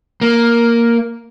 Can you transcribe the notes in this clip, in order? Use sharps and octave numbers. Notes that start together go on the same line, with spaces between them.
A#3